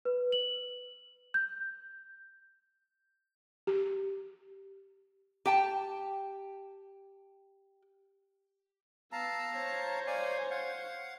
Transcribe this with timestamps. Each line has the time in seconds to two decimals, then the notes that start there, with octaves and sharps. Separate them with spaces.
0.05 B4
0.32 F#7
1.34 G6
3.67 G4
5.46 G4 G5 A5
9.12 B3 F5 A5 A#5 E6
9.56 C5 C#5
10.07 D5 F5 G#5
10.50 F5 F#5